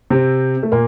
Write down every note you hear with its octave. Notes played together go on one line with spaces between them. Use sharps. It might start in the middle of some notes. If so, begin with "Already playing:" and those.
C3 C4
A3
A#2 A#3